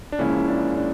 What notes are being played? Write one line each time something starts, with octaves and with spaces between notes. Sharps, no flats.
D4
C#2 C#3 F3 A#3 C#4 E4
D4
D4